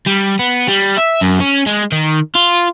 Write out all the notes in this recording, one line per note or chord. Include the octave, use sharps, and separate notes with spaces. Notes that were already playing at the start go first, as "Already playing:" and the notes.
G3
B3
G3
E5
F#2
C#4
G#3
D#3
F4